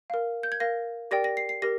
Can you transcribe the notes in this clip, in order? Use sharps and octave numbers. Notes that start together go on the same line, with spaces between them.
A#4 F5
G6
G#6
A#4 F5 A#6
G4 A#4 D5 G5 A#6
A#6
C7
C7
G4 A#4 A#6